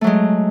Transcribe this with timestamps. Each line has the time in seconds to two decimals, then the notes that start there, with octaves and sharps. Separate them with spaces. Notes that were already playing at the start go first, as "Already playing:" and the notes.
0.01 A3
0.04 F#3
0.07 G#3